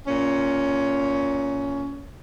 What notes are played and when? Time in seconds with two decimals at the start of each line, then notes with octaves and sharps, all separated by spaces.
0.06 A#2 C#4